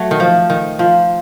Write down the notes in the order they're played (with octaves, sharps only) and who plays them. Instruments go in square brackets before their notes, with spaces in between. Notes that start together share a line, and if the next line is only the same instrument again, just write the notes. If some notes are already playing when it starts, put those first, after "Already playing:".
Already playing: [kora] F#3 A3
D#3
F3
D#3
F3